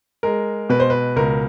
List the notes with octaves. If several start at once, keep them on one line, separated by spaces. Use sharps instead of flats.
G#3 A#4
B2 B4
C5
B4
C#2 A#4